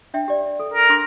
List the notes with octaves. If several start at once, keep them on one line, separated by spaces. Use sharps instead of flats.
D4 E5 G5
G4 D5
A4
A#4
D4 C6 D6